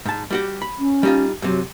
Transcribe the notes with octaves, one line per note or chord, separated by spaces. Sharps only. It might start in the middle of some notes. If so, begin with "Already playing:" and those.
G#2 A5
G3 F#4 G4
B5
C#4
G3 D#4 F4
F#2 C3 F#3